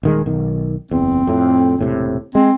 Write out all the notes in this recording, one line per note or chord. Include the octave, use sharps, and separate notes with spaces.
D#1 D#3 G#3
B1 D#3
F#1 E2 C4
F2 A2
E1 A2 C3
G#3 C4